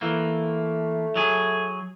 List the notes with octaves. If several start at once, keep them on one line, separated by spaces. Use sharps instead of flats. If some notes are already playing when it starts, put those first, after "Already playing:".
E3 A3 A#3
F#3 G#4